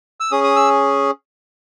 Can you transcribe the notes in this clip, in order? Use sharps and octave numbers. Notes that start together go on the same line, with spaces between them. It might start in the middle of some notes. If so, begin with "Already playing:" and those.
E6
C#4 G#4 D#6
D#6
E6